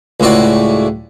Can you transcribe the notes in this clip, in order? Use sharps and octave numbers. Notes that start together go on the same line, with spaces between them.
C#2 A2 F#4 D5